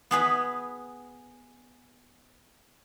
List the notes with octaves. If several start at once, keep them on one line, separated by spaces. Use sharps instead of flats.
B3 G#4 B4